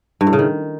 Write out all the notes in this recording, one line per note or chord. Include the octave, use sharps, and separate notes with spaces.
G2
A2
C#3
D#3